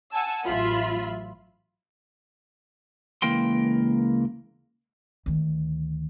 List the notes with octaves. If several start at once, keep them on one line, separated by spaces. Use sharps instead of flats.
F#5 G#5 A5 E6
A1 F#3 F4 E5 B5
C#2 E3 A#3 A#4 G5 C6
D2 D#3